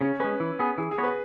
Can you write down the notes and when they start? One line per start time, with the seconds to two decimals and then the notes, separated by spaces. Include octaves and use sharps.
0.01 C#3 C#4
0.20 G#3 C#4 B4
0.40 E3
0.59 B3 G#4
0.78 E3 G#4
0.91 G#4
0.98 B3 F#4 C#5
1.03 B4